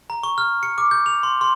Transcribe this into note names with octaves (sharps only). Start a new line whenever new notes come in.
A#5
C#6
F6
C#7
D6
G6
F7
C6
C6